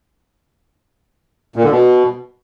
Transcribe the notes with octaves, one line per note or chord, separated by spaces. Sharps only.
A#2
D3
B2